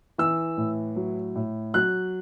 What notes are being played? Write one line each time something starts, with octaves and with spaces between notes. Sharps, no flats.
E3 E6
A2
F#3
A2
F#3 F#6